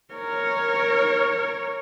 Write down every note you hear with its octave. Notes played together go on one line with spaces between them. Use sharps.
A#4 C#5